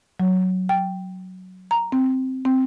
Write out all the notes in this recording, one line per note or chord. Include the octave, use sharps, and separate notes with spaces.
F#3
G5
A#5
C4
C4